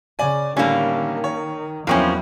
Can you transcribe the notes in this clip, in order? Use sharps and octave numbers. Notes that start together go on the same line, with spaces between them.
C#3 D5 G#5
A2 D3 D#3 G3 A#3 C#4
C#5
E2 F3 F#3 A#3 C4 C#4 E4 C#6